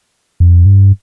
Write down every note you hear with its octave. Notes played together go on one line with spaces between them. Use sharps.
F2
G2